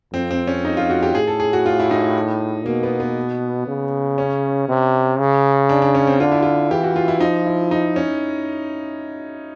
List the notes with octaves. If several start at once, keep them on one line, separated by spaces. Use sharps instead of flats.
F2 C4
C4
C#4
D#4
F4
F#4
G4
A2 G#4
A4
G#4
F#4
F4
E4
D#4
B2 A#3
B3
B3
C#3
C#4
C3
C#3
D4
D4
C#4
C4
D3 F4
E4
F4
E3 G4
F#4
F4
E4
F3 D#4
E4
D#4
C#4